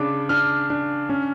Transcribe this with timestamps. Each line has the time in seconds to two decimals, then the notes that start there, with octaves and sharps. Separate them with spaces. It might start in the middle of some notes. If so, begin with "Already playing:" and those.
Already playing: C#3 D4 D6
0.29 D4 F6
0.70 D4
1.09 C#4